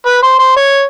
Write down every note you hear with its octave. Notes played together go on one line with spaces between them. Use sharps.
B4
C5
C5
C#5